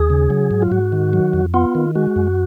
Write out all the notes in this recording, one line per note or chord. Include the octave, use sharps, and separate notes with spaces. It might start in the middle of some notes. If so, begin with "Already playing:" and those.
Already playing: D#2 G#4
C#3
F#3
G#2
F4
G#2 F#4
D#3
F#3
F2
B3 F4
D#3
G#3 F#4
F#2